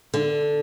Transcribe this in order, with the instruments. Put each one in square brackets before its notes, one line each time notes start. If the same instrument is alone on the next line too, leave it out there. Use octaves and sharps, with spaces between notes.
[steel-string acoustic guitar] D3